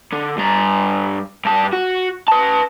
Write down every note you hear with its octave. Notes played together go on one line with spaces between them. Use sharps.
D3
G2 A#5
G2 A5
F#4
B4 A5